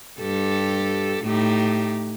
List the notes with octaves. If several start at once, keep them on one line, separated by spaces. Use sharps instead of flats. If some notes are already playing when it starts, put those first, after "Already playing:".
G2 G4 A4
A2 D#4 G4